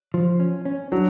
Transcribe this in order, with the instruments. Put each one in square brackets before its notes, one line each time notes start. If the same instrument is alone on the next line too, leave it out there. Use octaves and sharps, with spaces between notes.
[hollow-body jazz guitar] F3
C#4
C#4
[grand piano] F#3 [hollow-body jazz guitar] D4